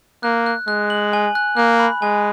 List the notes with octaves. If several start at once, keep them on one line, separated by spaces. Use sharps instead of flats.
A#3 F#6
F#6
G#3 F#6
F#7
G#5
F#6
A#3 F#6
B5
G#3 G#5